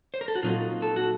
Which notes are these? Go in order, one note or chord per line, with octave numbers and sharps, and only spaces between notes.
C5
A#4
A4
F#4
A#2 F#3 C4 D#4 F4
A4
F#4